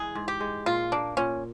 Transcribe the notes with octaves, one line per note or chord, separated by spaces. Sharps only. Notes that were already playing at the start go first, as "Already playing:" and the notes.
Already playing: E3 G#3 G#4
G#2
G4
G#3
A#2 F4
A#3 D4
A#2 C#4